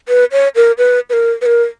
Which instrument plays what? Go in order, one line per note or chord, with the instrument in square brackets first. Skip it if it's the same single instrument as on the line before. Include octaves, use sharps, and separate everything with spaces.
[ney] B4
C#5
A#4
B4
B4
A#4
B4
A#4